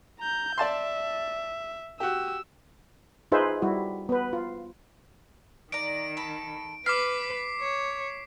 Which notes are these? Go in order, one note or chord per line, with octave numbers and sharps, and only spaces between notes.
A#5 G6
D5 E5 A5 C6
F#4 G4 E6
D#4 F4 G#4 B4 C5 E5
G3 E4 F#4
B3 B4
F4
D#3 D5 A#5 D7
A4 B5
B4 D6 F6 B6 C7
C#5